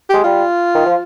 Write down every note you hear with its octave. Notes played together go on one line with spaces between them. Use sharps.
G#3 G4
G3 F4
D#3
F3